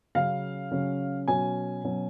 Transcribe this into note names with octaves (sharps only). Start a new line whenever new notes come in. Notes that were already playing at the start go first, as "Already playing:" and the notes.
C#3 F#3 C#4 F5
C#3 F#3 C#4
B2 F#3 C#4 G#5
B2 F#3 C#4